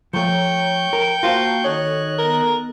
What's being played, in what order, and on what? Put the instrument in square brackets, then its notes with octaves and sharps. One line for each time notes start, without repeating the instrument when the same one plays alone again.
[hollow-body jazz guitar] F3 A3 [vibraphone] C#5 A#5 [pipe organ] G5 C#6 G6
[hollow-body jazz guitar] A#4
[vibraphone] A#3 A5 A#5 [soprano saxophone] F4 [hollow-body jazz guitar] F#4 C5
[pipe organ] D#3 D#5 F#6 [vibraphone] D#4 A4 [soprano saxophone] C#5
[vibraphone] B3 A4 [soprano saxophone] A#4